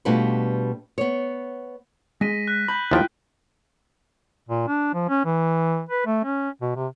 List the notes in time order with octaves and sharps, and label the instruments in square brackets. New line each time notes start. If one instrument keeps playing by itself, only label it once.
[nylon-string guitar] B2 G3 A3 D4 F4 B4
B3 C#5
[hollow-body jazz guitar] G#3 [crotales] A#6 B6 D#7
[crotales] F#6 B6
[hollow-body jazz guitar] B5 [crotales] G6 F#7
[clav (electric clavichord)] D#2 F3 [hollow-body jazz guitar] E4 F4 G5
[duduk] A#2
D4
F3
C#4
E3
B4
A3
C#4
B2
C3